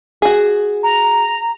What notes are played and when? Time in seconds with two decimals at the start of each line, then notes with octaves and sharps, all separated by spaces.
0.22 F#4 G#4
0.83 A#5